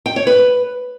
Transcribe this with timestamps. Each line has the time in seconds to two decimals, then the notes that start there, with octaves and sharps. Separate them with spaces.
0.06 G5
0.16 C#5
0.27 B4